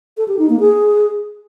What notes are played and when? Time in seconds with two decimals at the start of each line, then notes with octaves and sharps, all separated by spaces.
0.18 A4
0.28 G4
0.39 D#4
0.49 A#3
0.60 G#4